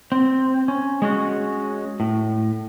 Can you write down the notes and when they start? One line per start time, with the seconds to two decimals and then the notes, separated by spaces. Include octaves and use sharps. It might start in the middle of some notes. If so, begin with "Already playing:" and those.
0.12 C4
0.68 C#4
1.02 G#3 C#4 F#4
2.00 A2